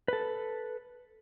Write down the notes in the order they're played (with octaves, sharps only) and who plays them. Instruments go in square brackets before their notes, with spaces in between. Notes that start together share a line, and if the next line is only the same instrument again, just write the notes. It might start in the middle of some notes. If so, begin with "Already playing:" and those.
[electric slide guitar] A4 B4